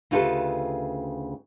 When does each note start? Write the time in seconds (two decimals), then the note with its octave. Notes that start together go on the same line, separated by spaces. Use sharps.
0.11 D2 C#3 F4 G4 A4 B4